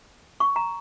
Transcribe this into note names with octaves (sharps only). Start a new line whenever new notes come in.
C#6
A#5